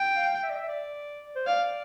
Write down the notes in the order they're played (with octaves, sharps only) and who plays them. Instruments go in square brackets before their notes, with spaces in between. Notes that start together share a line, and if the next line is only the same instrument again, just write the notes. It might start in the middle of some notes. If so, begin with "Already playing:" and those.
Already playing: [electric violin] G5
[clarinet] F5
E5
D5
E5
D5
C5
[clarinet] D5 [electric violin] F5